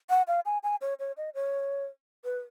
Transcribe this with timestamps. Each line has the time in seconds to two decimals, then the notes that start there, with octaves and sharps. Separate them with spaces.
0.10 F#5
0.28 F5
0.46 G#5
0.63 G#5
0.81 C#5
1.00 C#5
1.17 D#5
1.35 C#5
2.25 B4